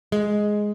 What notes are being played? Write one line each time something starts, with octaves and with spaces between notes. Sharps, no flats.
G#3